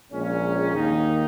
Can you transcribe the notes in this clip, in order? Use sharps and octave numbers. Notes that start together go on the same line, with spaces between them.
A#1 A#2 G#3 C#4
D#2 D#3 A#3 D#4